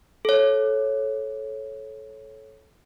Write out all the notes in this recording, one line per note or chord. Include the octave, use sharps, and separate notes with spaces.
A4 C#5